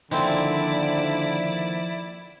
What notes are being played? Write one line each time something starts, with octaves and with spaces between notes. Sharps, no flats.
D3 D#3 F3 G#3 A#3 C4 E4 D5